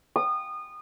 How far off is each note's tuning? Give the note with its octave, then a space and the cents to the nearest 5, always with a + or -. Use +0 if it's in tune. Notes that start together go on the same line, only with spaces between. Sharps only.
D#6 -25